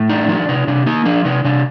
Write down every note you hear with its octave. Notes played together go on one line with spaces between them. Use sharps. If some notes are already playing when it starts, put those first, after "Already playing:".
Already playing: A2
D4 D#4
F3 D#4
C3 D#4
C3 D4
A#3 D#4
F3 D4
C3 D#4
C3 D4